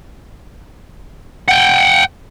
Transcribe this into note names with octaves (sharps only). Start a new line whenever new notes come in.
F#5 G5